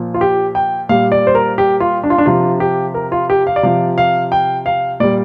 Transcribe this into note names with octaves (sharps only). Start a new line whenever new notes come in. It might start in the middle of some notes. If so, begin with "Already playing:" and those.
Already playing: A#2 F3
F4
G4
G5
A#2 G3 F5
D5
C5
A#4
G4
F4
D4
F4
D4
C3 F3 F4
G4
A#4
F4
G4
F5
D5
C3 F3 F5
F5
G5
F5
A#2 G3 D5